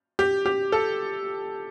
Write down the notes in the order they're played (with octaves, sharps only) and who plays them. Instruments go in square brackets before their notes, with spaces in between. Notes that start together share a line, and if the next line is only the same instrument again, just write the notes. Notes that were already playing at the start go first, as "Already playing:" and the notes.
[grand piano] G4
G4
A4